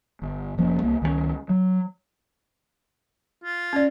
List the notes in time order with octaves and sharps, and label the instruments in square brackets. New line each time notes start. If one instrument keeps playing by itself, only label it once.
[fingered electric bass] G1
F1 F3 A#3 C#4
C2 A#3
C#2 D#3 G3 C#4
F#3
[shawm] F4
[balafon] C#4 D5